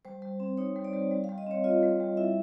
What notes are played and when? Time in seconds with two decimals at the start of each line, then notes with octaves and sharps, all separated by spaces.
0.05 G3 C5
0.22 G3
0.40 C4
0.58 D#4 C#5
0.76 G3
0.85 D5
0.93 G3
1.11 G3
1.24 F5
1.29 G3
1.38 D#5
1.46 C4 C#5
1.64 F4 D#5
1.83 G3
2.00 G3
2.17 E4 E5